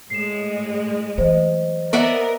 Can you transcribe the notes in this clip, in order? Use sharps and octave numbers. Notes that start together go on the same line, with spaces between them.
A2 G#3 C7 E7
E3 F#3 C5 D#5
B3 A#4 D5 E5 F#5